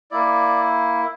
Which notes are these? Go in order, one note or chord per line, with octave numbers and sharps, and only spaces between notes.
A#3 E4 D5